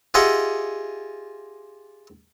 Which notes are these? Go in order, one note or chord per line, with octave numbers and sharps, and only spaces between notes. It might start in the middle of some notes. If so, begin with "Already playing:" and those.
F4 G4 G#4 D#5 E5 F#5